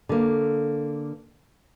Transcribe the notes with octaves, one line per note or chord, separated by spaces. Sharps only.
D3 A#3